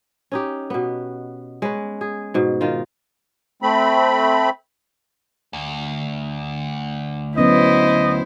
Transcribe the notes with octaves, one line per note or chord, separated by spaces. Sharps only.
C#4 D#4 G4
B2 B3
G#3 C#4 B4
G#4
G#2 B2
D#3 F4
A3 C4 B5
D2
F#3 B3 C#4 E4 C5 D#5